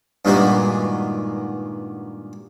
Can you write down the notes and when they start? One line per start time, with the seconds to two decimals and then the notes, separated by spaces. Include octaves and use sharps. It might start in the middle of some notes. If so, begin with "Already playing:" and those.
0.25 G2 A#2 D#3 G#3 B3 F#4